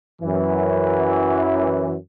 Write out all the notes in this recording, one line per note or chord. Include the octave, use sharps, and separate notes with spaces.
F#2 E3